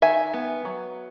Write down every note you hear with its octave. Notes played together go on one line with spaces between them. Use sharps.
D#3 E5 G#5
B3
F#3